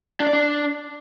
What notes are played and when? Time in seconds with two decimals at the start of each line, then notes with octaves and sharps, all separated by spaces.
0.20 D4
0.27 D5
0.33 D4